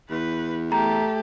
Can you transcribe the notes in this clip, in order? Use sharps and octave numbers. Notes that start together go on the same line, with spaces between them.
E2 B4
A3 G4 A#5